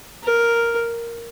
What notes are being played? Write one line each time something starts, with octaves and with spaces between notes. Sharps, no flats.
A#4